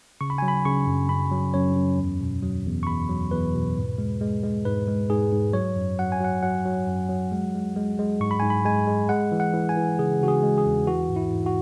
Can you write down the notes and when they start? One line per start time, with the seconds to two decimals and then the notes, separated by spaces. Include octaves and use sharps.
0.21 C#3 C#6
0.30 B5
0.38 G#5
0.42 F#3
0.48 B5
0.65 C#3 C#6
0.87 F#2
1.09 F#2 B5
1.32 F#3
1.54 F#2 C#5
1.76 F#2
1.98 E2
2.21 B2
2.43 F#3
2.66 E2
2.83 C#6
2.87 E2 B5
3.09 F#3
3.31 E2 B4
3.55 B2
3.76 G#2
3.98 G#3
4.21 G#3
4.43 G#3
4.65 G#2 B4
4.88 G#3
5.10 G#2 G#4
5.32 G#2
5.53 F#3 C#5
5.76 F#2
5.99 F#3 F#5
6.12 G#5
6.20 F#3 F#5
6.42 F#3 F#5
6.65 F#3
6.87 F#2
7.09 F#3
7.32 G#3
7.54 G#3
7.76 G#3
7.99 G#3
8.20 G#2 C#6
8.31 B5
8.40 G#2 G#5
8.50 B5
8.65 G#3 G#5
8.87 G#3
9.09 G#3 F#5
9.32 E3
9.40 F#5
9.54 E3
9.69 G#5
9.76 E3
9.99 C#3 G#4
10.21 C#3 F#4
10.28 G#4
10.43 G#3
10.58 G#4
10.66 E2
10.87 E3 F#4
11.09 G#2
11.16 E4
11.32 G#2
11.46 F#4